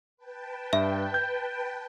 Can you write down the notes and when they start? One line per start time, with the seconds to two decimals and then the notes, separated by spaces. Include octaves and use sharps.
0.17 B4 G5 A5
0.73 G2 E5
1.14 G6